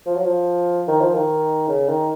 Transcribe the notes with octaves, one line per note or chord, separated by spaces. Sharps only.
F3
F#3
F3
D#3
F3
D#3
C#3
D#3